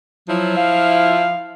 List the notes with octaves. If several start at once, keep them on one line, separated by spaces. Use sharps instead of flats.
F3 F#3 E4
F5